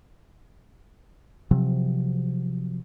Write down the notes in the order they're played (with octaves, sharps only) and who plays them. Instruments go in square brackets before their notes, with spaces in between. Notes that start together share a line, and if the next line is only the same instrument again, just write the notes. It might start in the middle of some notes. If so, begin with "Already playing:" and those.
[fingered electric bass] C3 F3 F#3